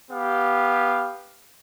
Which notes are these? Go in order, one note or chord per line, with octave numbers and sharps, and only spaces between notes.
B3 G4 F5